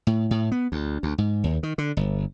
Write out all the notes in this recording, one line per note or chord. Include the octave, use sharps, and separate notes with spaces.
A2
A2
B3
D2
D2
G#2
D#2
D#3
D3
G1